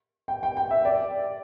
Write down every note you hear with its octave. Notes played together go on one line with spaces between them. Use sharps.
G5
G5
G5
E5
D5